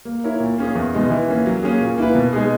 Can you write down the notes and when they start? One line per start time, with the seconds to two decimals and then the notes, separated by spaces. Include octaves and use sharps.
0.05 A#3
0.24 E4 A#4 C#5
0.40 A#2
0.58 A#3 C#4 G#4
0.75 E2
0.93 B2 G#3 D#4
1.10 E3
1.28 A#3 C#4
1.46 F#3
1.63 A#3 C#4 G#4
1.81 A#2
1.98 A#3 E4 B4
2.15 B2
2.33 G#3 D#4 G#4